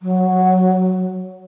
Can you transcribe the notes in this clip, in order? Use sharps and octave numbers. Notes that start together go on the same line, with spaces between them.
F#3